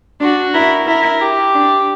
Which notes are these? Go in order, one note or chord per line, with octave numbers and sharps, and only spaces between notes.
D4 F#4
E4 A#4
E4 A#4
G4
D4